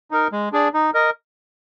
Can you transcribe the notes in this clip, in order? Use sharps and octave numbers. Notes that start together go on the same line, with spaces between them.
D#4 A#4
G#3
D4 G#4 D5
D#4
A#4 D#5